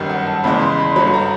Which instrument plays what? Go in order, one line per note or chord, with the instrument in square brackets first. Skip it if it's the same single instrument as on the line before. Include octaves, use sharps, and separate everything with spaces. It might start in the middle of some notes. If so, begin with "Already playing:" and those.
Already playing: [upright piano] G1 F#2 D#3 G3
F#5
A5
E2 C#3 E3 G#3 B5
C6
B5
G1 G2 D3 F#3 B5
A#5